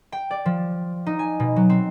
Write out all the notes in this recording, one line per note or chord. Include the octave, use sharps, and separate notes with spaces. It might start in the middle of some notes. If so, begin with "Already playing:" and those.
G5
D5
F3
D#4
G#5
B2
F#3
C4